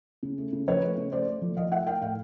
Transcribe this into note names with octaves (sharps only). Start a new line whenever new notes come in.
C#3
A3
C#3
F3 B4 C#5
A3
C#3
A3 C5 D5
A3
F3
F3 D#5 F5
A3 E5 F#5
A3 F5 G5
A2 F5 G5